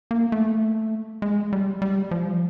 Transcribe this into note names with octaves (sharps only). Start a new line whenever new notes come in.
A#3
A3
G#3
G3
G3
F3